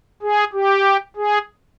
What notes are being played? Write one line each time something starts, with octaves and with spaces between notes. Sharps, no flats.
G#4
G4
G#4